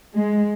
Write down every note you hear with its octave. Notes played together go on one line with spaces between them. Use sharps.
G#3